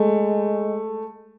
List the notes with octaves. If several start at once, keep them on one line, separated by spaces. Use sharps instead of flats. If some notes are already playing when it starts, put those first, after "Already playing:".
Already playing: G#3 A3